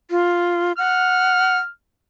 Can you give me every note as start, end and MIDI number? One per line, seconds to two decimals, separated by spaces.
0.11 0.72 65
0.78 1.57 78
0.78 1.68 89